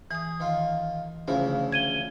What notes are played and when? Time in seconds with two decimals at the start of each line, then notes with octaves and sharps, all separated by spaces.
0.11 E3 G#4 D#6
0.40 D#3 F4
1.28 D2 C#3 F3 E4
1.72 G#6 D#7 G7